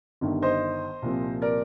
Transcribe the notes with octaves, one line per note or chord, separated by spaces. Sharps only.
G1 G2 D#3
C5 D#5
C2 A#2 F3
A#4 D5